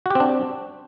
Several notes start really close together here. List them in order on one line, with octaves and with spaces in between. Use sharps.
F#4 G4 C4 D4